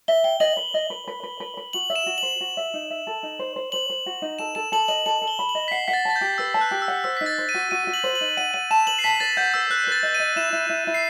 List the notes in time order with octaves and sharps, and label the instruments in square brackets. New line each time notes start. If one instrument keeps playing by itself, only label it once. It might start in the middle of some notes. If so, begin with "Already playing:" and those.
[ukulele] E5 [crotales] G7
[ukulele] G5 [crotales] G7
[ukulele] D#5 [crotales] F#7
[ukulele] B4
D#5
B4
B4
B4
B4
B4
[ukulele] F#4 [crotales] F#7
[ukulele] E5
[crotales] E7
[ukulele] F#4
[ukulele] C5 [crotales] F#7
[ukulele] F#4
E5
D#4
E5
A4
D#4
C5
C5
[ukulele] C5 [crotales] F#7
[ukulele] C5
F#4
D#4
[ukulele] A4 [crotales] E7
[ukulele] A4 [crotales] E7
[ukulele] A4 [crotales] F#7
[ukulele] D#5 [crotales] F#7
[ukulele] A4 [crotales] F#7
[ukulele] A4
[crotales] G7
[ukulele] B5
[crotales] F#7
[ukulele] D#5
[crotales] B6
[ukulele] F#5 [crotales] C7
[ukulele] F#5 [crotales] B6
[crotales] A6
[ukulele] A5 [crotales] A6
[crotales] G6
[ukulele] G4
[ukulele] B4 [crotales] E6
[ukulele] A5
[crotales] F#6
[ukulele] G4
[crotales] E6
[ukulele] F#5
[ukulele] C5 [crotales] E6
[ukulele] D#4 [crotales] B6
[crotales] A6
[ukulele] C5
[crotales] D#7
[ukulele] F#4
[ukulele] F#4 [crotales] D#7
[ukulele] F#4
[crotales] F#7
[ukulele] C5
[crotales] F#7
[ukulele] D#4
[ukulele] F#5 [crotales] D#7
[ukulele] F#5 [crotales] D#7
[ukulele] A5 [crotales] E7
[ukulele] B4 [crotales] F#7
[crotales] C7
[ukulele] A5 [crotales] B6
[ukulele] B4 [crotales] A6
[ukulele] F#5 [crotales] G6
[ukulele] B4 [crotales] E6
[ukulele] B4 [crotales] F#6
[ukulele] B4 [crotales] A6
[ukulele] D#5
[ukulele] D#5 [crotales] D#7
[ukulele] E4 [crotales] E7
[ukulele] E4
E4
E4
[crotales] C7